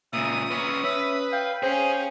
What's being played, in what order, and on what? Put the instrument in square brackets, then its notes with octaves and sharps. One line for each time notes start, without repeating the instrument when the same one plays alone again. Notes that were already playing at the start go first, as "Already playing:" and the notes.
[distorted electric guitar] C#2 A#2 [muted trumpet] E5 [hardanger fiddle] D#6
[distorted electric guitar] C#4 B4
[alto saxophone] C#4 [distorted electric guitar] B4 [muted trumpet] E5
[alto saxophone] F5 [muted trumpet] G5
[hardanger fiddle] C#4 F5 [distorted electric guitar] G#4 [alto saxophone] C5 [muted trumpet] G5